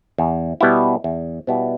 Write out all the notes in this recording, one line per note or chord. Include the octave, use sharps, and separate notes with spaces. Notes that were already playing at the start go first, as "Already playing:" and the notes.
E2
B2 G3 B3 E4
E2
B2 G3 B3 E4